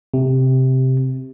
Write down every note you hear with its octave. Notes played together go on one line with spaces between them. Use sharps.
C3